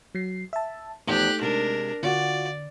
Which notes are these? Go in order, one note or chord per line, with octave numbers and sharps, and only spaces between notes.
F#3 C7
E5 A5
E2 F3 A3 D#4 G4 A4 F#6
C3 G#3 D4 A#4
D3 F4 F#4 D5